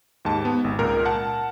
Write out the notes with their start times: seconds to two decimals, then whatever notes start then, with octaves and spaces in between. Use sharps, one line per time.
0.25 D#2 G#2 A5
0.45 B3
0.64 G#1
0.79 C#2 A#2 A#4 F6
1.05 F#5 A5